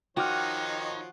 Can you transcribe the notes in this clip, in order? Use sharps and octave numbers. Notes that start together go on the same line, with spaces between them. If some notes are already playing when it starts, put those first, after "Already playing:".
D#3 F3 D#4 F#4 C#5 G5 D6 F6